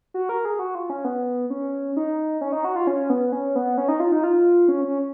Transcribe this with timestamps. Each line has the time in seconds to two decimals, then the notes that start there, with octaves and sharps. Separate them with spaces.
0.14 F#4
0.29 A#4
0.45 G#4
0.59 F#4
0.75 F4
0.90 C#4
1.04 B3
1.50 C#4
1.97 D#4
2.41 C#4
2.52 D#4
2.64 F#4
2.76 F4
2.87 C#4
3.10 B3
3.32 C#4
3.56 B3
3.78 C#4
3.88 D#4
4.00 F4
4.12 D#4
4.24 F4
4.68 C#4
4.84 C#4